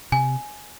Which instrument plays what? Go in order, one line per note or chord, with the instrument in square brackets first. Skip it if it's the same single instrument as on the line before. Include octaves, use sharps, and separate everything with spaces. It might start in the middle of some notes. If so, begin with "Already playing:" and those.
[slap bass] C3 [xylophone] G#5